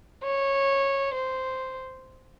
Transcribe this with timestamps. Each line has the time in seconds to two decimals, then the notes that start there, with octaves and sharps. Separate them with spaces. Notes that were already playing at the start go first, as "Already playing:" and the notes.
0.24 C#5
1.14 C5